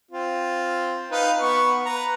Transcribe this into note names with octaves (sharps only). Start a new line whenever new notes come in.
C4 F4
D#4 B4 F5
B3 C#6
B4 A#5